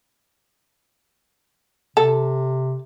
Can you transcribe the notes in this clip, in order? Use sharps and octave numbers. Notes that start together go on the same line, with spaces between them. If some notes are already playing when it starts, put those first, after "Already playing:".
C3 A4